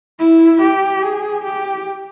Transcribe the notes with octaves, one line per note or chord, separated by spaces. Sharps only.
E4
G4
G#4
G4